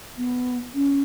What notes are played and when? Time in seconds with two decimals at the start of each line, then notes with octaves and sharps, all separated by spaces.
0.17 B3
0.74 C#4